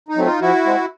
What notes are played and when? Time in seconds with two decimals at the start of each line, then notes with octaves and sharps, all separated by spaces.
0.09 D#4
0.16 F#3 A3 C4
0.25 D#4 F4
0.41 F3 E4 F#4
0.65 G#3 C4